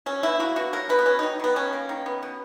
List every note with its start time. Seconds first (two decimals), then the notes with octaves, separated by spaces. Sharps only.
0.06 F#3 C#4
0.23 B2 E4
0.40 A#3 F#4
0.56 B2 F#4
0.73 F#3 A#4
0.89 B2 B4
0.99 B3
1.06 F#3 C#4
1.19 D#3 D#4
1.40 D#3 B3
1.56 F#3 C#4
1.73 A#3
1.89 D#3
2.06 B3
2.23 B2